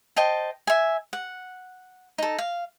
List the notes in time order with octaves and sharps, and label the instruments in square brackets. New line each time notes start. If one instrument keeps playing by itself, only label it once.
[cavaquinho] C5 D#5 G5 A5
E5 G#5
F#5
D#4 A4
F5